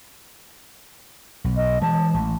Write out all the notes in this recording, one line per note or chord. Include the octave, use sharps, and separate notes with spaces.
B1
D#5
E3 G#3 A5
A1